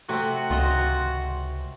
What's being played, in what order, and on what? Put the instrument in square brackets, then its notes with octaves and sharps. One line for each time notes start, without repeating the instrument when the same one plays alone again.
[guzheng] C3 C4 [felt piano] A3 [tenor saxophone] F#4
[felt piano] G#1 [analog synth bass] C#2 [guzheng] F4 D#5 A#5